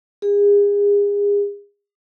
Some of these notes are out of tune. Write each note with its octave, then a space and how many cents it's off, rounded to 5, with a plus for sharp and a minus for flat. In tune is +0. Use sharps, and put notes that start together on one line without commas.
G#4 -35